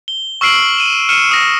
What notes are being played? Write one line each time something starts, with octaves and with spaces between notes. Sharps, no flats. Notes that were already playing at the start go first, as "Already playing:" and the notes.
G7
C#6 E6 F6 C7 D7 F#7
D#7 E7
F6 C#7 D#7 E7
D#6 A#6